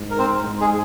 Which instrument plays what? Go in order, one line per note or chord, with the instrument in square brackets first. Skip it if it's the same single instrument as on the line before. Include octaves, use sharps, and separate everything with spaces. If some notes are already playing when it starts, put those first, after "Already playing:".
Already playing: [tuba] G#2
[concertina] A#4
C4 C5
[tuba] G#2
[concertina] G#3 G#4